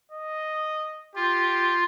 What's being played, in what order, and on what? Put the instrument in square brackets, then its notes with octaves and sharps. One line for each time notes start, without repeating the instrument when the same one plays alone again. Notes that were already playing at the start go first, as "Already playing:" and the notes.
[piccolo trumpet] D#5
[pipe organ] F4 [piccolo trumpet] G4